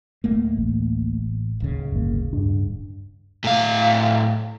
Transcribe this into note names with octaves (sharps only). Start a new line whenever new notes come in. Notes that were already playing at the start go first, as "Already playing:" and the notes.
D1 A3 A#3
A1
D1 D#2 C#3
G1 A#3
G2 D4
A2 F5